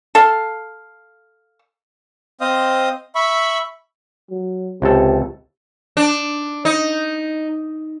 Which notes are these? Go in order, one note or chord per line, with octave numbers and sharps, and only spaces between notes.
A4 F5
C4 C5 D#5 F5 D#6
E5 B5 C#6
F#3
C#2 C3 A4
D4
D#4